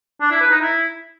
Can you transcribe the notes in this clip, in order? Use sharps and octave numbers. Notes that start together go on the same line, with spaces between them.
D4
E4
B4
D#4
E4